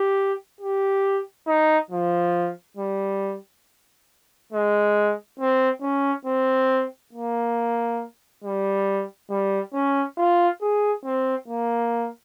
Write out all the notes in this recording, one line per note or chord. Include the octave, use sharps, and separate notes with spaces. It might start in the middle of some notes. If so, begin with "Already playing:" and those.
Already playing: G4
G4
D#4
F3
G3
G#3
C4
C#4
C4
A#3
G3
G3
C#4
F4
G#4
C4
A#3